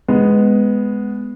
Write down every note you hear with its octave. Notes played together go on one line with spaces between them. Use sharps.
G#3 B3